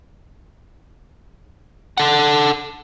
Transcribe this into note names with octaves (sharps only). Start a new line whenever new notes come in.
A4 F#5